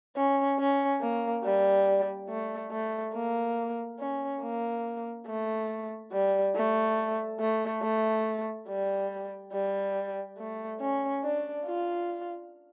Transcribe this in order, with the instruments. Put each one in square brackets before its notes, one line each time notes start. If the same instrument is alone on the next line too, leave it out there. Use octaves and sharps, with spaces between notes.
[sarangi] C#4
C#4
A#3
G3
A3
A3
A#3
C#4
A#3
A3
G3
A3
A3
A3
G3
G3
A3
C#4
D4
F4